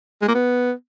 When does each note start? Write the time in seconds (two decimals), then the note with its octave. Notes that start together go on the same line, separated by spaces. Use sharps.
0.22 G#3
0.28 A#3
0.35 B3